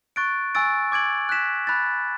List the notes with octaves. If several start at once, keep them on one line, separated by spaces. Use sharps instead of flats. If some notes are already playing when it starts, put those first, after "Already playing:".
C#6 F#6 A6 D7
G#5 C#6 E6 A6 D7
D6 G#6 D7 F#7
F#6 B6 E7
B5 F#6 A6